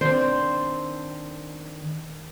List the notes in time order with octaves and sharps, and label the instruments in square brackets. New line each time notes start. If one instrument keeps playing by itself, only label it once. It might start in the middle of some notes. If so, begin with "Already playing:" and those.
[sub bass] D#3 [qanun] C4 D4 [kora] C5